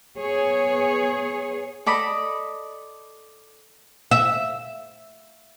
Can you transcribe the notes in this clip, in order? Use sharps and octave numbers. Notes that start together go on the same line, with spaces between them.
B3 G#4 C#5
A4 D5 D#5 B5
E5